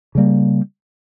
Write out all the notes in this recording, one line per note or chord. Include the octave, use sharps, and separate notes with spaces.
C#3 G3 A#3